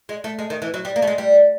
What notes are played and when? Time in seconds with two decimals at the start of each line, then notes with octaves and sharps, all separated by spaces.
0.09 G#3
0.24 A3
0.39 G#3
0.50 D#3
0.62 E3
0.74 F#3
0.85 G3
0.96 A#3
1.02 A3
1.07 G#3
1.18 G3